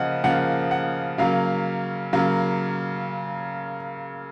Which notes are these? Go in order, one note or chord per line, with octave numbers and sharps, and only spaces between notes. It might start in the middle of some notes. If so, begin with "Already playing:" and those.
Already playing: C#3 F3 A#3 D#5 F#5
C#3 F3 A#3 F#5
F#5
C#3 F#3 A#3 F5
C#3 F#3 A#3